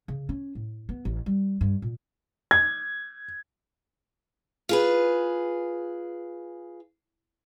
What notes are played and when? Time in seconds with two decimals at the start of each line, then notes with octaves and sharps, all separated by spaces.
0.08 C#3
0.29 C#4
0.55 A2
0.89 B3
1.05 A1
1.26 G3
1.61 G2
1.82 A#2
2.51 G#6
4.69 F4 G#4 B4